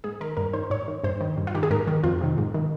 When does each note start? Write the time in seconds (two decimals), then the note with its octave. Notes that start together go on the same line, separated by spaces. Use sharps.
0.04 G#2 G#4
0.21 D#3 A#4
0.37 G2 A#4
0.53 D#3 C5
0.70 G#2 C#5
0.88 D#3
1.04 G2 C5
1.21 D#3
1.37 G2
1.47 F4
1.55 D#3 G4
1.63 G#4
1.71 G#2 A#4
1.87 D#3
2.04 F2 F4
2.21 C3 D#3
2.38 G#2
2.54 D#3